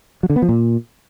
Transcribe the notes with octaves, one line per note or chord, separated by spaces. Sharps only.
F#3
D3
B3
F3
A#2